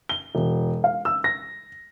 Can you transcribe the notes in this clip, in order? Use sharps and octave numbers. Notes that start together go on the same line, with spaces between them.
G7
E1
F5
E6
A#6